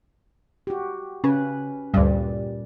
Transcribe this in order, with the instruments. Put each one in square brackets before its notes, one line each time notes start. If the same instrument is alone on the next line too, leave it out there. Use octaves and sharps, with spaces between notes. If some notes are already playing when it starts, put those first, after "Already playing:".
[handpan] F#4 G4
[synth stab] C#3 [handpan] C#4 B4
[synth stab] D2 G2 [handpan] A#2 G3 D5